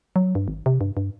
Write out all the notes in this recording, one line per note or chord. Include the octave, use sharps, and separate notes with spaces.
F#3
G2
G#1
C3
G2
G2